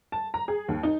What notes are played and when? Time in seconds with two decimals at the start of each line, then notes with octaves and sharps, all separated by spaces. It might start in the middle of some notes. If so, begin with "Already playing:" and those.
0.12 A5
0.34 A#5
0.48 G#4
0.68 D#2
0.83 D#4